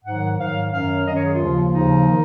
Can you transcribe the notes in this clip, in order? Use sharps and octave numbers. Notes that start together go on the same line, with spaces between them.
G#2 D#3 F#3 F#5
G#2 D#3 F#3 F5
F#2 D#3 F#3 F5
F#2 D#3 F#3 D#5
C#5
G#4
F4
D#2 C#3 F3
D#2 C#3 F3 D#4
D#3